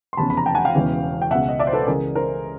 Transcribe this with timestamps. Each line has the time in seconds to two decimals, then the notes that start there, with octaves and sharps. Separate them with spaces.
0.13 C6
0.17 F1 E2 C#3 A5 B5
0.30 B5
0.37 A#5
0.46 G5 A5
0.55 F#5 G#5
0.65 F5 G5
0.75 E1 E2 C#3 E3
1.22 G5
1.31 C#2 B2 E5 F#5
1.49 D#5
1.59 D5 E5
1.67 C5
1.73 A4 B4
1.87 C#2 C#3 E3 G#4 A#4
2.15 A#4 C5